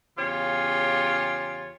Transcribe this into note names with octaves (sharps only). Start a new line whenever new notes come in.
E2 C#3 F4 G4 C#5 F5